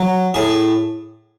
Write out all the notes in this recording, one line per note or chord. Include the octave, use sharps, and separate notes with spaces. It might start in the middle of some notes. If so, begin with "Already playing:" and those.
Already playing: F#3
A2 G#4